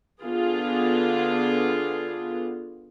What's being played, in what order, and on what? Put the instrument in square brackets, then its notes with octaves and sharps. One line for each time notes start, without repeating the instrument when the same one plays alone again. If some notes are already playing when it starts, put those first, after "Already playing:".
[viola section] D3 B3 F4 G#4